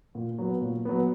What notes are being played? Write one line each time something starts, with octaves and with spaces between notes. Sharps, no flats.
A#2
F#3 B3
A#2
F#3 B3